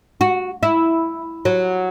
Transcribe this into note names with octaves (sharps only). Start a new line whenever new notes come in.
F#4
E4
F#3